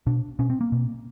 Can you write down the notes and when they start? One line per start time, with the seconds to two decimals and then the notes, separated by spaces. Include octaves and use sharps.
0.07 B2 D4
0.39 B2 C#4
0.50 C4
0.61 A#3
0.72 B2